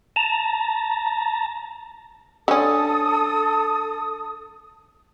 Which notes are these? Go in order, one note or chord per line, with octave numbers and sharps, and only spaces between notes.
A5 A#5
D3 C#4 A4 D#6